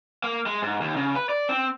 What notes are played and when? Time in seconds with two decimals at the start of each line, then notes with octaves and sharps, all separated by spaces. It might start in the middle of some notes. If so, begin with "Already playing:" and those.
0.24 A#3
0.46 G#3
0.62 G#2
0.81 D#2
0.96 C#3
1.15 B4
1.29 D5
1.49 C4